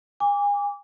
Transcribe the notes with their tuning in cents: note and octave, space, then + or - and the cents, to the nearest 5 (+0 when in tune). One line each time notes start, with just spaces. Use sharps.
G#5 -35 D6 -25